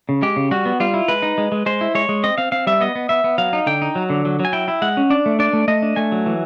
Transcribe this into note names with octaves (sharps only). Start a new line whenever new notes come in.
C#3
G#3 G4
C#3
G3 F#4
B3
G3 F4
E4
G#3 B4
D#4
G#3
G#3
G#3 C5
E4
G#3 C#5
G#3
C4 D#5
C4 F5
C4 F5
G3 E5
B3 D#5
B3
B3 E5
B3
F#3 F5
D#4
D3 G5
D#4
F#3
D3
F#3
F#3
G#5
E4 G5
E4
G#3 F#5
C#4
D4 D5
A3
D4 D5
A3
A3 D#5
D4
A3 G#5
F#3
E3